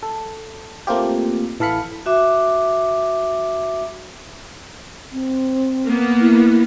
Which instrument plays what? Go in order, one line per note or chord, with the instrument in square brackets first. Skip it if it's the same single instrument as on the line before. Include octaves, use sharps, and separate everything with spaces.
[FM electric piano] A4
A3 A#3 C4 F4 G4
A1 E3 A4 F5 B5 C#7
[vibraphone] F#4 E5 D6
[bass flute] C4
[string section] A#3 B3
[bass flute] E4